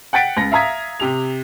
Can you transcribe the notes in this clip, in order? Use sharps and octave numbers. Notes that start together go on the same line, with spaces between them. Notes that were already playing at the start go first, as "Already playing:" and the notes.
F#5 G5 A6 B6 D7
C#2 A#6
E5 F5 A#5 D#6 G#6 B6
C3 G4 F7